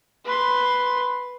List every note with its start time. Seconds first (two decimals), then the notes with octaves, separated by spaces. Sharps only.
0.25 B4 C6